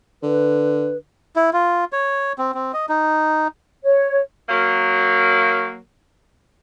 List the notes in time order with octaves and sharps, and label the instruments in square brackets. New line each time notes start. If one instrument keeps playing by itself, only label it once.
[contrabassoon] D3 [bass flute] B4
[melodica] E4
F4
C#5
C4
C4
D#5
D#4
[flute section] C#5
[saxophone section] F#3 A#3